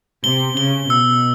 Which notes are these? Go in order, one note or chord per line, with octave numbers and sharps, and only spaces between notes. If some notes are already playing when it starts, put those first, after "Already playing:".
C3 G7
C#3 G7
B2 E6